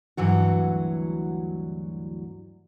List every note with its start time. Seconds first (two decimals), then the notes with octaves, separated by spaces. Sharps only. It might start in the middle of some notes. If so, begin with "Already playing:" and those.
0.17 D2 G2 E3 F#3 F#4